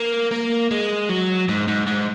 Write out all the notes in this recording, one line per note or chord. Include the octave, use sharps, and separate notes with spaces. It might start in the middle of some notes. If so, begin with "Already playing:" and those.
Already playing: A#3
A#3
G#3
F#3
G#2
G#2
G#2